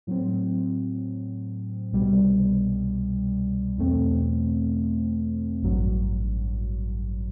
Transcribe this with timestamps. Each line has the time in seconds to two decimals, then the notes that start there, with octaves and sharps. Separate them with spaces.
0.07 A2 F#3 C4
1.92 C2 B2 G3
3.78 E2 B2 A3 C4
5.62 A1 G2 F#3